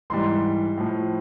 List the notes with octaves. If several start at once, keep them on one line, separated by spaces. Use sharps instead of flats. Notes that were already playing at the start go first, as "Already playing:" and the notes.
G#2 E3 G3 C6
A2 F3